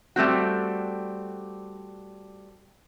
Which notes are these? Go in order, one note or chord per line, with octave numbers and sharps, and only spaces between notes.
G3 A3 C4 F#4